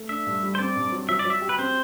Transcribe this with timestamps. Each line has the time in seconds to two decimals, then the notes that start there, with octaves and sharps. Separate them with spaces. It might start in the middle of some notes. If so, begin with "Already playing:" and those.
Already playing: A3
0.09 D4 E5
0.27 G2
0.43 G3
0.55 C5
0.59 C4 D5
0.76 G2
0.92 F#3
1.09 F#3 E5
1.19 D5
1.25 F#3
1.30 E5
1.42 G4
1.49 B4
1.59 C4 C5